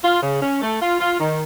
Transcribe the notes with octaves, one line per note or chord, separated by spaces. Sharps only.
F4
C#3
C#4
A3
F4
F4
D#3